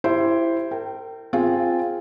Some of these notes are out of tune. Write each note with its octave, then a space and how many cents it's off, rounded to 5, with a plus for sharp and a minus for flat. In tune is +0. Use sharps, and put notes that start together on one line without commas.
E4 +15 G4 +0 C5 +0
A#4 -35 G5 -20
C4 +0 F4 +0 G#4 +0